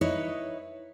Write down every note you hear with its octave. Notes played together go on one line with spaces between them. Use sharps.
D#4 E4 B4 C#5 D#5